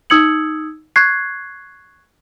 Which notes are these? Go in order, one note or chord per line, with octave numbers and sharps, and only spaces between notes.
D#4 D#6 E6 G#6 C#7 F#7
C#6 F#6 G#6 C7